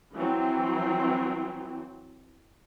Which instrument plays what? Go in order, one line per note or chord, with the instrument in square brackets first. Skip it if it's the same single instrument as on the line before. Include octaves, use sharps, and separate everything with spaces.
[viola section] E3 F#3 C4